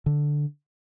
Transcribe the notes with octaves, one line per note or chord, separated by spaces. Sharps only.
D3